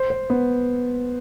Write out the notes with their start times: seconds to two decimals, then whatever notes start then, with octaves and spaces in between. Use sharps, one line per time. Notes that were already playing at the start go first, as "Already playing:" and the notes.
Already playing: C5
0.10 C5
0.30 B3